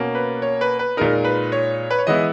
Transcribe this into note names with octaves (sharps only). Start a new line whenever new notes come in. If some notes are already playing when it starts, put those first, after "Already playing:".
Already playing: B2 A#3 C#4
B4
C#5
B4
B4
A#2 G#3 D#4 A#4
B4
C#5
B4
C#5
E3 G#3 B3 E4 D#5